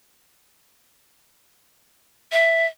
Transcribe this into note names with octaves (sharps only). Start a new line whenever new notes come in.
E5